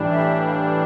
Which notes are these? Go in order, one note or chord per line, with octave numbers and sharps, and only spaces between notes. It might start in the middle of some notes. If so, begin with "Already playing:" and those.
Already playing: A2 E3 G3 D4
E5
F5